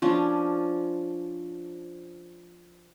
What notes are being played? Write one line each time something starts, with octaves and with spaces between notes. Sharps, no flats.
F3 C#4 D4